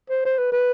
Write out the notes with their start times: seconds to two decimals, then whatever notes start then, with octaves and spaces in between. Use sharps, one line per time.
0.10 C5
0.25 C5
0.38 B4
0.52 B4